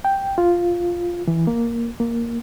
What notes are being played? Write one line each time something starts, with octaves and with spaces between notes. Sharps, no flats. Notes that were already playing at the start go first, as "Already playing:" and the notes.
G5
F4
E3
A#3
A#3